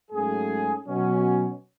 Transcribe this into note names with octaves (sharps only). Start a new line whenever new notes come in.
G#2 F#3 A3 C#4 G#4
B2 F#3 C#4